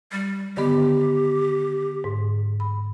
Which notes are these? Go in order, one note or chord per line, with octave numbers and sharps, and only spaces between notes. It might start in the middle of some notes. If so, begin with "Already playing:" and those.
G3
D3 D#3 B3 G4
G#2
B5